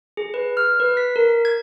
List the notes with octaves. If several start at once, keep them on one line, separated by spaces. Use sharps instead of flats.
G#4
B4
F6
B4
B6
A#4
G#6